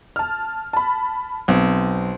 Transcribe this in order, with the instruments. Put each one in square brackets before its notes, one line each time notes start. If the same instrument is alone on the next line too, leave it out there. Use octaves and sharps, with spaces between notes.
[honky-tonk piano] A5 F6
A5 B5
[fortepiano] B1 [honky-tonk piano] C4